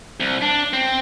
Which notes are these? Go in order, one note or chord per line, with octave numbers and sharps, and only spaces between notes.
C2
D4
C4